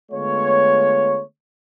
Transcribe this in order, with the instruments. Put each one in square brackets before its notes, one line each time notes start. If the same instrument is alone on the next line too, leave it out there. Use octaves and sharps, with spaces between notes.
[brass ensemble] D3 G#3 A3 B3 F4 C#5